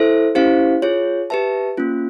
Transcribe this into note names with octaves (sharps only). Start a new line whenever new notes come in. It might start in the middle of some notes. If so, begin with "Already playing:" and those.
Already playing: E4 A4 C5 E5
C#4 E4 G4 C5 F5
F4 G#4 C#5
G4 B4 E5 A5
A#3 C#4 F4